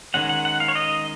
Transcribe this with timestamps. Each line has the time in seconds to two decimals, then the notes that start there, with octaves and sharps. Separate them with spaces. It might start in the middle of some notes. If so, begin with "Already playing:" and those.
0.14 D#3 G#3 C#4 F#5
0.29 F#5
0.45 F#5
0.60 F5
0.68 C#5
0.75 D#5